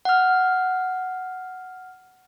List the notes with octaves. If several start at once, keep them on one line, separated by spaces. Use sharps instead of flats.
F#5 F6